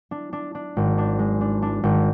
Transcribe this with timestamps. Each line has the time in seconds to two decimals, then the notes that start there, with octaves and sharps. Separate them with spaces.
0.11 D4
0.33 D4
0.55 D4
0.77 G#1
0.98 D4
1.19 G#3
1.41 D4
1.62 D4
1.83 G#1